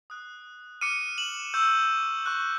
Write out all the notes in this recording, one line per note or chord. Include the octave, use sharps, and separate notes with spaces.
D#6 F#6
D6 F6 C#7 D#7
E7 F#7
C#6 E6 G6
C#6 F#6